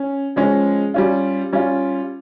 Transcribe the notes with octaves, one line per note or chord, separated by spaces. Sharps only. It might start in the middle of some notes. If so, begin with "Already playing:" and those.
Already playing: C#4
F3 G#3 C#4
G3 C#4 F4
G3 C#4 F4